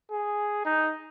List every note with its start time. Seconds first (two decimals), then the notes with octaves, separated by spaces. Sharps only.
0.11 G#4
0.65 D#4